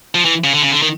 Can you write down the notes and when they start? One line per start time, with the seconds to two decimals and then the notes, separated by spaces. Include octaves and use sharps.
0.15 F3
0.25 E3
0.44 C#3
0.53 D3
0.63 C#3
0.72 D3
0.82 D#3